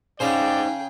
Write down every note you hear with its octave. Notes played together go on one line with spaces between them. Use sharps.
C#3 D#4 G#4 C5 D5 G5 A#5